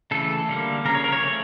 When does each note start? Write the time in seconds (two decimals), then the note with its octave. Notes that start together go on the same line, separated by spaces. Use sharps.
0.11 C#3 E3 A3 A4
0.49 D3 G3 A#3
0.85 C#3 F3 C#4 A#4
0.95 C#5
1.04 A#4
1.12 C#5
1.23 F3 A3 C#4